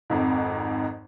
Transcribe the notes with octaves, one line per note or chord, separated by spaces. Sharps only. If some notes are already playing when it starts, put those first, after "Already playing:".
G#1 F2 G#2